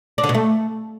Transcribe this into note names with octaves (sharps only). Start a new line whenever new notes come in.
D4
D3
B2
A3